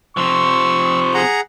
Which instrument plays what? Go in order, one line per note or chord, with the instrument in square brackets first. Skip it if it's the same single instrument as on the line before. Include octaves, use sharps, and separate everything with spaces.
[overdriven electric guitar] C3 F3 [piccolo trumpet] C#6 [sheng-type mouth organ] E6
[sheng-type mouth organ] G#4 F#5 A#5